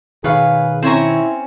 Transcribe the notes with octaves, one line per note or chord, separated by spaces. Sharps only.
B2 D#3 G#4 B4 C#5 F5
C4 C#4 E4 C5 C#5 A#5